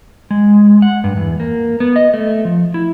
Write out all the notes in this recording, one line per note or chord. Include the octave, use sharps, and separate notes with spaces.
G#3
F#5
G2
E2
A#3
B3
D#5
A3
F3
E4